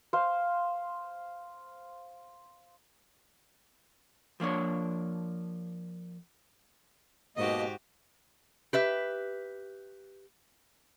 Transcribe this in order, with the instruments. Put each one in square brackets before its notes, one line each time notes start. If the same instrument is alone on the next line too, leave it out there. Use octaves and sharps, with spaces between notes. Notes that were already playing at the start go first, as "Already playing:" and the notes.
[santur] C5 F5
[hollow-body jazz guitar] F3 A#3 D4 C#5
[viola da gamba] G#2 F#4 G4 [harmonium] B2 A#3 [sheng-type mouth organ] D#5
[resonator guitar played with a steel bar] G4 B4 E5